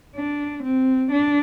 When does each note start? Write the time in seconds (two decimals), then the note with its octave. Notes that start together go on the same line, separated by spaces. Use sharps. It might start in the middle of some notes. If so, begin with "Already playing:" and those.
0.16 D4
0.63 C4
1.12 D4